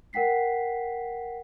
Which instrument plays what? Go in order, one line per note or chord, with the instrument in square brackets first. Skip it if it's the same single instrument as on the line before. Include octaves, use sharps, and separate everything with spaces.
[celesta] A#4 F#5 G5 B6 C7